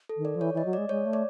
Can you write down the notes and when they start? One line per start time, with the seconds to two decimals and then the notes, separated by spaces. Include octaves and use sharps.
0.09 A4
0.17 D#3
0.25 D5
0.36 F3
0.41 E3 C#5
0.54 E3 D#5
0.65 F#3
0.73 G#3 D5
0.89 G#3 C#5
1.05 A3
1.13 D5